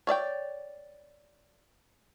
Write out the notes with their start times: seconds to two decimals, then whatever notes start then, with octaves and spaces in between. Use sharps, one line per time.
0.07 C#5 D5 E5 G5